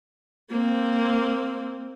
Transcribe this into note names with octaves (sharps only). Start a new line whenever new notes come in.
A#3 C4